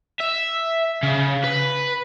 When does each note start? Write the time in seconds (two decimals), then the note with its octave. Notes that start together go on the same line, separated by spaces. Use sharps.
0.20 E5
1.03 C#3
1.44 B4